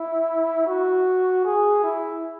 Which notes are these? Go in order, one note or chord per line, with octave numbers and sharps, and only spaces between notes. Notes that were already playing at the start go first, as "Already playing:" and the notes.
Already playing: E4
F#4
G#4
E4